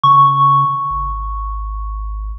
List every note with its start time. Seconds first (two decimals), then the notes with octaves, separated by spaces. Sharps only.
0.04 C#3 C#6
0.90 G#1